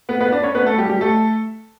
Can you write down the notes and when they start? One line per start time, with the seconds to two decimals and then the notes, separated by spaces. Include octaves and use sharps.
0.09 B3 B4
0.21 B3 B4
0.32 D4 D5
0.43 C#4 C#5
0.55 B3 B4
0.66 A3 A4
0.78 G3 G4
0.89 G3 G4
1.01 A3 A4